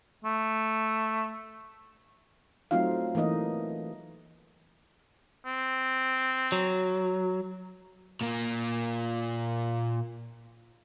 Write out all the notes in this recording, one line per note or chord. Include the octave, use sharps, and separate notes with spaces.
A3
F#3 A3 C4 D#4 F4 F5
E3 A3 A#3 D#4 D#5
C4
F#3
A#2 A#3